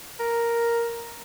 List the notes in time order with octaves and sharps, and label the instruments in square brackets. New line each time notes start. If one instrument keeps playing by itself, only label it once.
[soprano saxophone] A#4